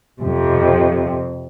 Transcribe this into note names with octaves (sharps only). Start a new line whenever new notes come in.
F2 C3